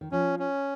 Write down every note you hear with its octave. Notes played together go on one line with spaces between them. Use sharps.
D#3
F3 C#4
C#4